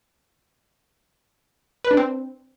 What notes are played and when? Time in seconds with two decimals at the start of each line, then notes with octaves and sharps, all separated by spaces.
1.84 B4
1.91 D4
1.97 C4